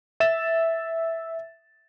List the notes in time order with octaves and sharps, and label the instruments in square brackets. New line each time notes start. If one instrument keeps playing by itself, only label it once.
[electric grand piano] E5 A6 E7